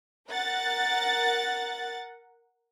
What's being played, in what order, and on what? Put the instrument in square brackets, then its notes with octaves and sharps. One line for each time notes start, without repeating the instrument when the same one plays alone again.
[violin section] A#4 F#5 A6